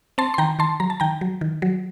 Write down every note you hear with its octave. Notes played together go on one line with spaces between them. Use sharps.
C4 A5 C6
C6
D#3 G5 A#5
D#3 A5 C6
F#3 A#5
A5
D#3 G5 A#5
F#3
D#3
F#3